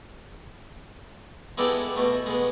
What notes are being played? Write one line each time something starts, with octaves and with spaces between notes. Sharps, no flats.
G#3 B3 E4 G4 A4 D5
B2 A3
G#3 B3